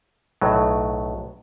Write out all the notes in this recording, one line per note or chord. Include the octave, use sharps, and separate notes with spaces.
B1 A2 F#3